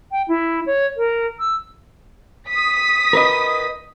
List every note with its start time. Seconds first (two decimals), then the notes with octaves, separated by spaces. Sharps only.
0.11 G5
0.28 E4
0.66 C#5
0.97 A#4
1.40 E6
2.50 D#6 B6
3.13 A#4 B4 D#5